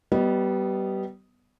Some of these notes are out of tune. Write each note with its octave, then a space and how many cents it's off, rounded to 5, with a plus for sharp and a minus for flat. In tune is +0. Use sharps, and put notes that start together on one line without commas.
G3 -25 B3 +0 D#5 +0